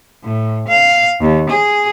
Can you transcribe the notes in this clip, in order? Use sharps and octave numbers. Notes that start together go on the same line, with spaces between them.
A2
F5
D#2
G#4